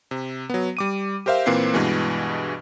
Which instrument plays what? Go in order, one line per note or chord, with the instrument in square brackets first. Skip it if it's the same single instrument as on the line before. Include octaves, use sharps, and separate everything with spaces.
[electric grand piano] C3
F#3 B3
G3 D6 D#7
G4 A#4 C5 E5 F5
A#2 E3 A#3 C4 B4 C7
G2 B2 E3 G#3